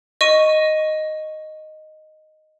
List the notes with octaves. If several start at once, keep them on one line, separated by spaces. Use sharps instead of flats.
D#5 C#6 D#7